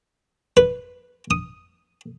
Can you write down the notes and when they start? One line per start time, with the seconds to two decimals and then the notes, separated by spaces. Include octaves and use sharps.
0.57 B4
1.31 D#6